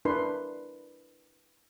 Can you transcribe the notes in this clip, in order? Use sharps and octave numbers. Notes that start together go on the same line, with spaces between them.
D4 E4 A#4 B4 C6